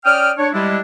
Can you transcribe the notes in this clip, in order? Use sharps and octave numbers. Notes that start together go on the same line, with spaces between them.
C#4 D5 G5 D#6 F6
D4 C#5
G3 G#3 D4 E4